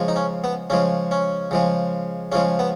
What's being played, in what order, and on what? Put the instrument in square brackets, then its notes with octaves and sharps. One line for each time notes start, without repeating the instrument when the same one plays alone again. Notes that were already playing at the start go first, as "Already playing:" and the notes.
Already playing: [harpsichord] C#3 F3 G#3
D#4
C#4
B3
C#3 F3 G#3 C#4
C#4
C#3 F3 G#3
C#3 F3 G#3 C#4
B3